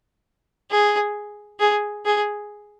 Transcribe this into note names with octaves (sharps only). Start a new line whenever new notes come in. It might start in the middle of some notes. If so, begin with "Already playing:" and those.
G#4
G#4
G#4